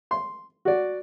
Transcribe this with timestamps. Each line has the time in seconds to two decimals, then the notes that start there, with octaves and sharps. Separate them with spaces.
0.11 C6
0.65 F#4 D5